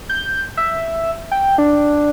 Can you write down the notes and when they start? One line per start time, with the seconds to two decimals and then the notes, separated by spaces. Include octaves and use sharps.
0.09 G6
0.57 E5
1.31 G5
1.58 D4